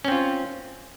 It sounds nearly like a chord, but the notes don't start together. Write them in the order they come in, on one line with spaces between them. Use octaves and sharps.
C#4 C4 F4